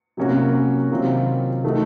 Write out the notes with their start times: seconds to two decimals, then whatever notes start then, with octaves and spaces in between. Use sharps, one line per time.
0.17 C3 F#3 A#3 C#4 F#4
0.90 C3 D#3 F#3 C4 F4
1.63 D#3 A3 D#4 F#4